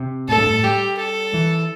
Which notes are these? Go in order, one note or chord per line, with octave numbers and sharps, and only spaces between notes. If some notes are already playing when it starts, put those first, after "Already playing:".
Already playing: C3
A2 A4
G2
A2
G3 G4
A4
E3